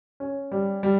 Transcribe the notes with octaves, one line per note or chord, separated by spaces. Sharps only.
C#4
G3
G3